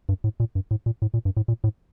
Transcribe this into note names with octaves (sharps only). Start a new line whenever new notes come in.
G2
A2
A#2
G2
A2
A#2
A2
A#2
G2
A2
A#2
A2